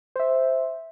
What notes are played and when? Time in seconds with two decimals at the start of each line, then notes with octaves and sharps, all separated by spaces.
0.16 C5 E5